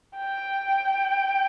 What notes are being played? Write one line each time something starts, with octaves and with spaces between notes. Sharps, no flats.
G5